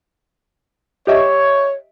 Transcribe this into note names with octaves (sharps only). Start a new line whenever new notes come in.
G4 C#5 D#5 E5